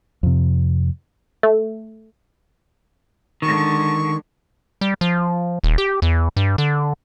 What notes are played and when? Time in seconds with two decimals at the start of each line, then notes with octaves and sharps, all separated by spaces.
0.23 F2 C3
1.43 A3
3.42 D3 D#3 G#3 C#6
4.81 G3
5.01 F3
5.64 D#1
5.78 G4
6.02 E2
6.37 G2
6.58 D3